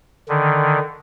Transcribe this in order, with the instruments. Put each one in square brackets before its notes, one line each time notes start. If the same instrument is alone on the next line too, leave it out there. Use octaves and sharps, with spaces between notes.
[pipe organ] D3 D#3